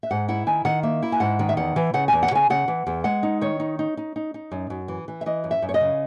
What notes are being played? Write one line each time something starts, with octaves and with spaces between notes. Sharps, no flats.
E5
G#2 F#5
E4 F#5
D#3 G#5
D#3 F#5
A#3 E5
E4
G#5
G#2 F#5
D#3
E5
E2 F#5
E3
C#3 F#5
E2 G#5
F#5
C#3 G#5
C#3 F#5
E3
E2
G#3 F#5
D#4
D#3 C#5
D#4
D#4
D#4
D#4
D#4
F#2
F#2
E3
E3
E5
E3 D#5
F#2
E5
F#2
C#5
D#5
C#3